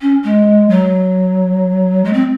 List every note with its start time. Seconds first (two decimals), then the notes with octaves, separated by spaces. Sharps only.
0.01 C#4
0.24 G#3
0.69 F#3
2.04 G#3
2.13 C4